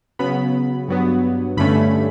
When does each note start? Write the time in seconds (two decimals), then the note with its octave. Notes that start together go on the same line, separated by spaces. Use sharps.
0.19 C#3 F#3 B3 B5
0.88 G2 F#3 B3
1.57 G2 D3 A3 C#4 B5